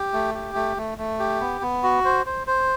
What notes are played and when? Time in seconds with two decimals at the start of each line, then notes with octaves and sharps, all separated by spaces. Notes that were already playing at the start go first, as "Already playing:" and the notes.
Already playing: G4
0.13 A3
0.35 G4
0.55 A3
0.77 A3
0.98 A3
1.19 G4
1.41 B3
1.61 B3
1.84 F#4
2.05 C5
2.26 C5
2.47 C5